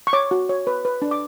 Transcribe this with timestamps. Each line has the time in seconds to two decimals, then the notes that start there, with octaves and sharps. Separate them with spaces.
0.07 C#6
0.13 C#5 D6
0.31 F#4
0.49 C#5
0.67 B4
0.85 B4
1.02 D4
1.11 D6